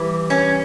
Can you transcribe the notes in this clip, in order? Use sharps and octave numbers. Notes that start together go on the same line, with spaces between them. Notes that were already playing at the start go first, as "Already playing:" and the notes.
Already playing: E3 G3
C#4